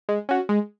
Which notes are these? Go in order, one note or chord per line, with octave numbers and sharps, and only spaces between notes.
G#3
C#4 F#4
G#3